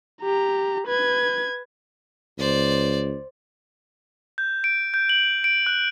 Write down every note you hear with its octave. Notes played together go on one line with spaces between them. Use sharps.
G4 A#5
B4 G#6
C#2 C5 D5
G6
D7
G6
F#7
D7
F#6